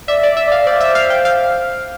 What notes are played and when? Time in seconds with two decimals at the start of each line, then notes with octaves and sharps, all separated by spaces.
0.08 D5 E5
0.23 D5
0.37 E5
0.47 D5 F5
0.66 C5 D5
0.80 E5
0.95 F5
1.10 G5
1.25 F5